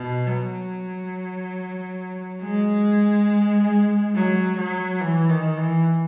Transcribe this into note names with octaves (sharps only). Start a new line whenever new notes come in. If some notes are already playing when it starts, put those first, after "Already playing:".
Already playing: B2
F#3
G#3
F#3
F#3
E3
D#3
E3